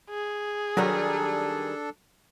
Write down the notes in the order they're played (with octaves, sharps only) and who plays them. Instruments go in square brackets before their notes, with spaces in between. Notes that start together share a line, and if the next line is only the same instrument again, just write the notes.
[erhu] G#4
[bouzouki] D#3 G3 A#4 [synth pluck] F#3 [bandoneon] D4 A4